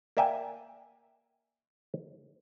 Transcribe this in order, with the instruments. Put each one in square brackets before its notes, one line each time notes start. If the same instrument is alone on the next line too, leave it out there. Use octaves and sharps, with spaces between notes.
[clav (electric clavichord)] A#3 D5 E5 G5 G#5